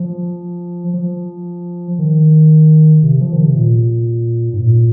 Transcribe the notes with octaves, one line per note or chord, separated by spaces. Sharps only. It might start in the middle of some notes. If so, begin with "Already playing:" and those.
Already playing: F3
F3
D#3
C3
F3
D#3
C3
A#2
G#2
A#2